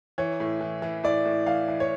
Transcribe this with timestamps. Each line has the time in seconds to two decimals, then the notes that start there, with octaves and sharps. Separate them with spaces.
0.18 E3 C#5
0.40 A2
0.61 E3
0.82 E3
1.04 A2 D5
1.25 A2
1.46 E3 F5
1.68 E3
1.80 C#5